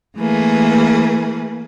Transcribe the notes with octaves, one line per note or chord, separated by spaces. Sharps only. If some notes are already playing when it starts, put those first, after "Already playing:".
E3 A3 A#3 G#4 B4